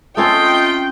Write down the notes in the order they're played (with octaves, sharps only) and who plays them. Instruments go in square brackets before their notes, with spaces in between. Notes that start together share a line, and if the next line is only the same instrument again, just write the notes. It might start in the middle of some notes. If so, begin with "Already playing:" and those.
[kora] A3 C4 C#4 [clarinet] F4 [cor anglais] D#5 [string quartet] G5